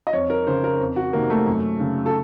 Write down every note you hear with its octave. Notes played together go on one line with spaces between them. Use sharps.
D#5
F2 C#5
A#4
C#3 C5
A#4
F2
F#4
C3 D#3 A#3
A3
F#2
C#3
A4